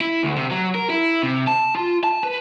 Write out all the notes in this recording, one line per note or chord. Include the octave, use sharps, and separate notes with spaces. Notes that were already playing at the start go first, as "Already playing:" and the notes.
E4
D2
C3
F#3
A#4
E4
C3
A5
F4
A5
B4